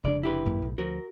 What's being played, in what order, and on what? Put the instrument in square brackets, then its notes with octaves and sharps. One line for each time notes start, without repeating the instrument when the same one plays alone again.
[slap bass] F1 C#3 D4 [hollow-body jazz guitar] C#2 D5
[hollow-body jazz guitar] E4 G4 B4
[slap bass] G#1 F#2 A#3
B1 A2
[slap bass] D2 F3 [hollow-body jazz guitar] F#4 A#4